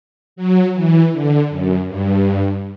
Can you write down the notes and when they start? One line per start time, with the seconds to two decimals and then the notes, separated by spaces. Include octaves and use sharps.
0.36 F#3
0.74 E3
1.12 D3
1.50 F#2
1.88 G2